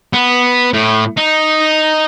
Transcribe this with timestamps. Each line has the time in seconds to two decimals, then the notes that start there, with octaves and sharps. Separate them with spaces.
0.13 B3
0.73 A2
1.17 D#4